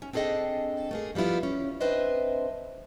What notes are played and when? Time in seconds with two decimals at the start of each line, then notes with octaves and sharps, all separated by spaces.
0.02 C#4
0.13 C4 D4 G#4 A4 D#5 G5
0.91 A3 A#3 G#4
1.15 F3 G3 B3 E4 F4
1.43 C#4
1.80 C4 D4 B4 C5 D#5 E5